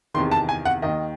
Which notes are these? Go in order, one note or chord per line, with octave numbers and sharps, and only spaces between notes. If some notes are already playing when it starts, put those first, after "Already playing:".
E2 C3 D#3 C6
A5
G#5
F#5
D#2 D#3 D#5